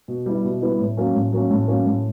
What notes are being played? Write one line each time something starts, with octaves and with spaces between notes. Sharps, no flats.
B2
G3 B3 E4
B2
G3 B3 E4
A2
F#3 A#3 C#4
A2
F#3 A#3 C#4
A2
F#3 A#3 C#4
A2